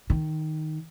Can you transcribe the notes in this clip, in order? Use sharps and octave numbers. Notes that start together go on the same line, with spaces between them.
D#3